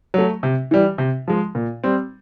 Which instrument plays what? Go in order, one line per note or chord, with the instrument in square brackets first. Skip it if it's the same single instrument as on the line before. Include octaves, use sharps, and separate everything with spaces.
[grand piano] F#3 A3
C3
E3 G3
C3
F3 G#3
A#2
G3 C4